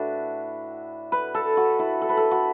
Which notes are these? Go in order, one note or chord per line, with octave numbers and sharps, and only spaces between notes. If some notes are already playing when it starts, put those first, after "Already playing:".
Already playing: A2 A3 D4 E4 F#4 A4 B4
B4
A4
F#4
E4
A4
B4
A4
F#4